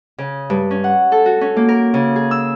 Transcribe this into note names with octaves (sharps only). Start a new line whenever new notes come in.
C#3
G2
C#4
F#5
A4
F#4
C#4
A#3
A#4
C#3
G#4
E6